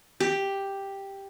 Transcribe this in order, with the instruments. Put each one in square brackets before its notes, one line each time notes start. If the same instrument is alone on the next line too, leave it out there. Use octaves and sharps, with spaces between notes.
[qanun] G4